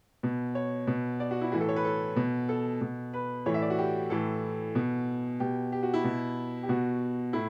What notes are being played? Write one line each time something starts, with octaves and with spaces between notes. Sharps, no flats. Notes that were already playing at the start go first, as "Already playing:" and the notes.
B2
C#5
B2
D5
F#4
E4
A2 E3 F#4
A4
C#5
B4
A4
B2
A4
B2
B4
A2 E3 C#5
E5
D5
F#4
G4
A2 E3 A4
B2
B2 G4
G4
F#4
E4
B2
G4
B2 F#4
A2 E4